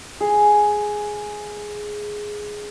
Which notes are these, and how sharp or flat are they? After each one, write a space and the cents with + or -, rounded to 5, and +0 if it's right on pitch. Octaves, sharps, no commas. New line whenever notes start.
G#4 +5